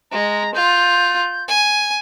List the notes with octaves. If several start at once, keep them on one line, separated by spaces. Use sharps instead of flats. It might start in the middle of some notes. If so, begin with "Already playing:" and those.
G#3 A#5
F4 G6
G#5